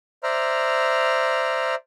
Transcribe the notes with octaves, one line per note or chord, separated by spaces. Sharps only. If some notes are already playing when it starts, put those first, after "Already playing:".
C5 D5 E5 A#5 F6